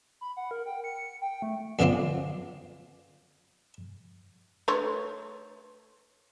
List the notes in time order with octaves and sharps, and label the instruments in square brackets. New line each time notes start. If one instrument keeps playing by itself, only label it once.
[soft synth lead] B5
F#5
A#4
G5
C#7
G5
A3
[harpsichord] F#2 D3 B3 C4 D4 F4
[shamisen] A3 D4 C#5 [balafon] B4 C6